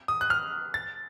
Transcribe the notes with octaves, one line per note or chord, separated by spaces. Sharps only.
D#6
F#6
F6
A6